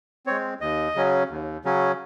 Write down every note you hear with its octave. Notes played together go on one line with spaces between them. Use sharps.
G#3 C4 C#5
D#2 D#5
C#3 F#3 C#4
D#2
C#3 F#3 C#4